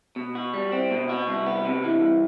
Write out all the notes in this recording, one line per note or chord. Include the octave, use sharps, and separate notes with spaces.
B2
F#4
G3
C4
B2
F#4
C2
B3
C3
E3
C2